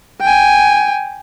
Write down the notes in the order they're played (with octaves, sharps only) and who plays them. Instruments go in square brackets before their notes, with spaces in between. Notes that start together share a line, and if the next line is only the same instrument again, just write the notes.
[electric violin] G5 G#5